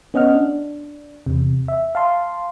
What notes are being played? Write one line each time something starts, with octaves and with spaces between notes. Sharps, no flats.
B3 C#4 D#5 F#5 F6
D4
E2 C3
E5
F5 A5 C6